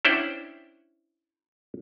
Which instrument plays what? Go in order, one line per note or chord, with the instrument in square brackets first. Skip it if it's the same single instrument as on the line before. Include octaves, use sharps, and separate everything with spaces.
[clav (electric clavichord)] C#4 D4 E4 C5 F#5 G5